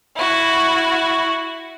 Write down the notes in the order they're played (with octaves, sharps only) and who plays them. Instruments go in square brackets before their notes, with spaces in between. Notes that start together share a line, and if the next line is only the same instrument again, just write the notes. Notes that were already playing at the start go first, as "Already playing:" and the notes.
[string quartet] E4 F#4